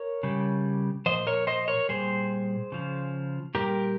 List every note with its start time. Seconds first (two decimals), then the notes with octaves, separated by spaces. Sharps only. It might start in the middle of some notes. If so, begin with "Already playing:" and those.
Already playing: A#4 C#5
0.23 C#3 G3
1.06 A#2 F3 C5 D#5
1.27 A#4 C#5
1.47 C5 D#5
1.68 A#4 C#5
1.89 A#2 G3 G#4 C5
2.72 C#3 F3
3.55 A#2 G3 G4 A#4